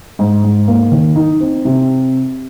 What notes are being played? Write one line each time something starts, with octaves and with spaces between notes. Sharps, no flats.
G#2
G#2
A#3
D#3
D#4
C4
C3